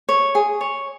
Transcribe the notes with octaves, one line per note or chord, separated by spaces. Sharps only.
C#5
G#4
C#5